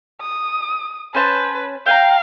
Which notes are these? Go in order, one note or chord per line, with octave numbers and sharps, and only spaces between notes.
D#6
C#4 B4 C5 A5
F5 G5 G#5 A#5